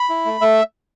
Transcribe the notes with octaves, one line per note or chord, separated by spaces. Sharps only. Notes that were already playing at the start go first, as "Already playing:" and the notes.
Already playing: B5
E4
A3
A3 E5